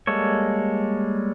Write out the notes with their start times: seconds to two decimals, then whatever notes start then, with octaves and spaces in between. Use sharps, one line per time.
0.07 G3 G#3 A#3 A4 C#5